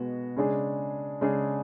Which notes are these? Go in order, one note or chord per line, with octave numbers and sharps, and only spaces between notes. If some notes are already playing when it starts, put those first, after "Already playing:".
Already playing: B2 G#3 B3 F#4
C#3 G#3 D4 G#4
C#3 G#3 D4 G#4